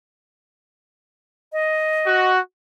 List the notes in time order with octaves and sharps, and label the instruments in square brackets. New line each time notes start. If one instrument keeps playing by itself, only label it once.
[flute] D#5
[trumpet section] F#4